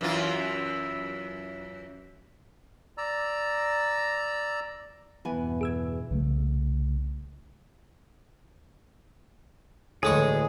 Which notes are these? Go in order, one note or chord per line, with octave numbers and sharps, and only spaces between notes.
F#2 E3 F4
D5 A#5 E6
E2 G2 B2 E3 B3 G#5
G#4 E6 G#6
C2 C#3 G3 A3
D2 A2 E3 G#3 G#4 C#6